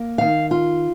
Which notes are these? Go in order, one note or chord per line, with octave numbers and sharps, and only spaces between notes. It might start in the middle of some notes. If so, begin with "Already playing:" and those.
Already playing: A#3
D#3 F5
F4